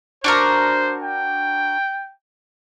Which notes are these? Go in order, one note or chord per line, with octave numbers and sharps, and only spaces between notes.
D4 F#4 A#4 C5
G5